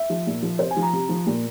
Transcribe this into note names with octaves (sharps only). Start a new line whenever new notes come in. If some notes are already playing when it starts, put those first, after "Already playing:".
Already playing: E5
F3
A#2
F3
C3 C5
G#5
F3
A#5
C3
F3
A#2